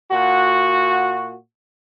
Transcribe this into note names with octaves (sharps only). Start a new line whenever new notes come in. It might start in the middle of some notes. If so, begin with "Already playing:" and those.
A#2 F#4